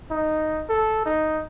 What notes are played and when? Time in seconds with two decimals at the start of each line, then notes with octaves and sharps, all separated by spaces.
0.11 D#4
0.69 A4
1.06 D#4